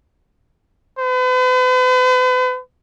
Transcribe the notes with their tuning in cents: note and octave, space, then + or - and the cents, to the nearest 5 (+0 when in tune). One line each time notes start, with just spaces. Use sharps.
B4 +45